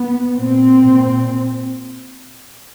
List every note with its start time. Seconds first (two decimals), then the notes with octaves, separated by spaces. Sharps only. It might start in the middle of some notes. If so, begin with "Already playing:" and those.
Already playing: B3
0.35 A#2 C4
0.85 A#2